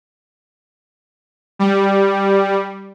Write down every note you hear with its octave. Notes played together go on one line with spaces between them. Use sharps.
G3